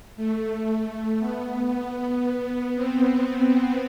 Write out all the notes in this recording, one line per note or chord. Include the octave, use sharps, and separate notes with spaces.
A3
B3
B3
C4